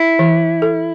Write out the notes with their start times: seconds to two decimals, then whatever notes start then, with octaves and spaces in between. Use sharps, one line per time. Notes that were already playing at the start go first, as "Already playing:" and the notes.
Already playing: E4
0.19 E3
0.62 A4